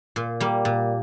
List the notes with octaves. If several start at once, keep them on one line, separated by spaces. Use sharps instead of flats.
A#2
G3 A#3
A#2